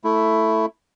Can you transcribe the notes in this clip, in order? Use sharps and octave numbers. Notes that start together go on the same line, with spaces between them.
A3 E4